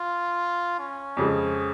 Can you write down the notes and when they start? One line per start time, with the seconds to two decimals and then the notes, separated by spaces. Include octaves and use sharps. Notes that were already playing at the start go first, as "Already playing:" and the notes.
Already playing: F4
0.79 C#4
1.17 F2 C#3 G#3